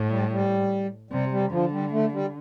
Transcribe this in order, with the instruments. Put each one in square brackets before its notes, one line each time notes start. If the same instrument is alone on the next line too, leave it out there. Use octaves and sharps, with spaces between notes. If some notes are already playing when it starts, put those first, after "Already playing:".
Already playing: [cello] A2
[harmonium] G3
G3
[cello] C3 [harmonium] G3
[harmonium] G3
[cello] D3 [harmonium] F3
[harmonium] G3
A3
G3